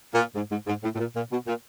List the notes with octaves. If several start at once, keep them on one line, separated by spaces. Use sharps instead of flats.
A#2
G#2
G#2
G#2
A2
A2
A#2
A#2
B2
A#2